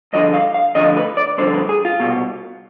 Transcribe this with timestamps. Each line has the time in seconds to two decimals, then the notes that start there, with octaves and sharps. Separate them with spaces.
0.13 G2 D3 F3 D#5
0.34 F5
0.54 F5
0.75 D2 D3 F3 D#5
0.97 B4
1.17 D5
1.38 G2 D3 F3 C5
1.54 B4
1.69 G#4
1.85 F4
2.00 C2 B2